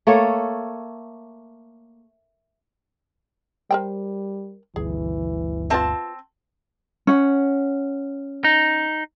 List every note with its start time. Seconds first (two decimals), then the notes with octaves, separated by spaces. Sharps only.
0.07 A3 A#3 A4 C#5
3.71 G3 A#4 C5 G5
4.76 G1 D2 E3 G#4
5.70 C4 F4 B4 E5 A5
7.07 C#4 F#5
8.44 D#4